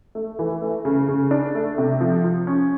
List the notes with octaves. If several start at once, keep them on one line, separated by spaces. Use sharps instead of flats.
A3
E3
A3
C#3
C#3
D4
A3
C3
F3
F3
C#4